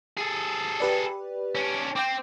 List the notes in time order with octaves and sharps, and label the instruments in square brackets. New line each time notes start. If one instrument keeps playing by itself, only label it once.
[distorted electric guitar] G#4 A4
[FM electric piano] G4 B4 D5
[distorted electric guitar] C#4 D4
[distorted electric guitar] C4 [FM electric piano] G5 D6